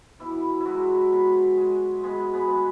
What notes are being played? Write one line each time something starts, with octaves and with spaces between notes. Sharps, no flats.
B2 E3 E4
E4
F#3 G#3 F#4
B2
G#3
B2 G#3 G#4
B3 B4
G#3